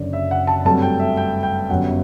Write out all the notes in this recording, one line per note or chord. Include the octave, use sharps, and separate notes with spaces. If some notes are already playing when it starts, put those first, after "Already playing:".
Already playing: F#1 F#2 D3 D5
E5
F#5
A5
G2 F#3 A3 C4 A5
G5
E5
G5
G5
G1 F#2 F#3 F#5